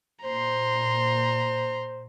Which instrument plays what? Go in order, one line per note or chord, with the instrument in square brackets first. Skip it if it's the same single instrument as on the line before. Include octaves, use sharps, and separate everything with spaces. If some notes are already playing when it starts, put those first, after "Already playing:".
[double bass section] A#2 [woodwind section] C5 [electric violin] A#5 C6